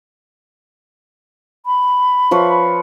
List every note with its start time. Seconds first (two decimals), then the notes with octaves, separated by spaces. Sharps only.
1.66 B5
2.31 F3 B4 C#5